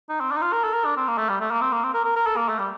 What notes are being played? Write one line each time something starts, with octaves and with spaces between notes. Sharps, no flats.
D#4
C4
D4
D#4
F4
A#4
A4
A#4
D4
C4
A#3
A3
G3
A3
A#3
C4
A#3
C4
A#4
A#4
A#4
A4
A#3
A3
G3